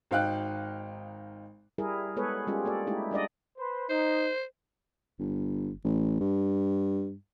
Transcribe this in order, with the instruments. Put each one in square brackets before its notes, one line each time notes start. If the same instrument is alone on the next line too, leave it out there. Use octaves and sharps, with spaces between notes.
[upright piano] G#1 D#4 F5 G5 F#6
[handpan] G3 E4 G#4 A#4
G#3 B3 G#4 A4 B4 C#5
G3 G#3 C#4 F4 G4 G#4
A#3 A4 D5
G#3 A3 D#4 E4 G4
G3 D4 D5 D#5
[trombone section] B4 C5
[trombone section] D#4 [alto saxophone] C5
[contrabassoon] G1
A1
G2